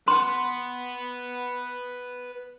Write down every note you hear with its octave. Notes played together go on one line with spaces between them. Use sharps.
B4 F#5 C6